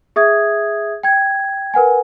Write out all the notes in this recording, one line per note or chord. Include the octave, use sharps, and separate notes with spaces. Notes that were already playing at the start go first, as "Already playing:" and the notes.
G#4 E5 D#6 G#6
G5 G#6
A#4 B4 F#5 G#5